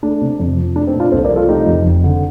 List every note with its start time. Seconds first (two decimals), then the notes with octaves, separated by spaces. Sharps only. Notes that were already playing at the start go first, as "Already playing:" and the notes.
0.03 A3 D4
0.21 C3
0.39 F2
0.57 F3
0.76 A3 D4
0.87 C4 D#4
0.95 A#2
1.00 D4 F4
1.12 C2 A4 C5
1.24 A#4 D5
1.31 F3
1.36 F4 A4
1.48 A3 D#4 G4
1.67 F2
1.85 F1
2.04 D3